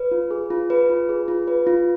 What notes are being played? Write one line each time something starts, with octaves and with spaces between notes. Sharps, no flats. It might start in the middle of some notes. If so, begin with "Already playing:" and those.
Already playing: B4
F4
G#4
F4
B4
F4
G#4
F4
B4
F4